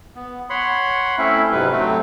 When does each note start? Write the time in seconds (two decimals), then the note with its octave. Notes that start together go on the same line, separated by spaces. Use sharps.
0.16 B3
0.50 C#5 F#5 B5 C6
1.18 A3 C4 C#4 E4 E5
1.52 F2 G#2 C3 F#3 G3 B4
1.71 F#3 A3 C4